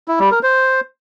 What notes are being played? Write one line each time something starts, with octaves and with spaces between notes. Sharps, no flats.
E4
G3
A#4
C5